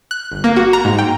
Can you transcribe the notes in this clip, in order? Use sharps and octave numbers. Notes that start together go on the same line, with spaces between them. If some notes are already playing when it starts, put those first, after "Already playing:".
F#6
G1
A#3
F#4
A#5
G#2
G5